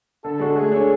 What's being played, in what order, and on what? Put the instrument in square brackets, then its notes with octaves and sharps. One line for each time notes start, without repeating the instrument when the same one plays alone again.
[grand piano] D3 [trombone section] A4
[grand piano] G#3 D4 F#4
[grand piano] A3 [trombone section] G#4
[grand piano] D4 A4 C#5